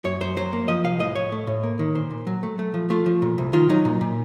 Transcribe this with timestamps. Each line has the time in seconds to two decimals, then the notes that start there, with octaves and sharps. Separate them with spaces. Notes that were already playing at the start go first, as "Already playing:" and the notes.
0.05 F#2 C#5
0.21 F#2 C5
0.37 F#3 C5
0.53 A#3
0.68 F3 D#5
0.84 C2 F5
0.99 A2 D#5
1.15 A2 C#5
1.32 A3
1.47 A2
1.63 A#3
1.79 D#3
1.95 A#2 C5
2.11 A#2
2.27 F#3
2.43 A3
2.59 A3
2.74 F3
2.90 A3 F4
3.06 F3
3.22 A#2
3.38 C2
3.53 D#3 F4
3.69 F#3 D#4
3.85 A#2
4.01 A#2